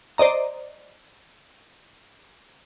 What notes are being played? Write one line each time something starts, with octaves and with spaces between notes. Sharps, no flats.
C5 D5 D#5 A#5